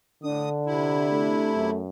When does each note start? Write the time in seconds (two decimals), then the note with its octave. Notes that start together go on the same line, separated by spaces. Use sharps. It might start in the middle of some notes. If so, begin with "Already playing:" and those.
0.23 A2 D3 D4 D#6
0.66 C3 E4
1.11 A3
1.56 F#2